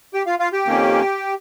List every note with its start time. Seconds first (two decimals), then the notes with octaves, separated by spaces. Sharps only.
0.14 G4 G5
0.26 F4 F5
0.39 F4 F5
0.53 G4 G5
0.66 F2 D#3 A#3 C#4